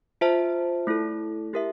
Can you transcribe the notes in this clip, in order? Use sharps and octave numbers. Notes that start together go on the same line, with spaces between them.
F4 C5 E5 A5
A3 E4 A4
E4 G4 A#4 E5